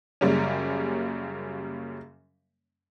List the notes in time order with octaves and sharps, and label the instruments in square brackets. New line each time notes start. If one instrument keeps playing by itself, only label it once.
[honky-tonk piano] F#2 C#3 G3 A#3 C#4